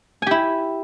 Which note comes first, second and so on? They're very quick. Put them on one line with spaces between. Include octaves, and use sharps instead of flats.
G#5 G4 E4